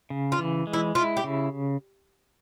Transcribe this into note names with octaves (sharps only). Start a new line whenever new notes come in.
C#3
F4
E3
G#3
E4
E4 F4
G4
C#3